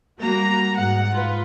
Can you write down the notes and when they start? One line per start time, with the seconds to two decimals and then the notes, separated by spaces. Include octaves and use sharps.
0.20 G3 A#3 F#4 A#5
0.75 G#2 F#5
1.13 F4 B4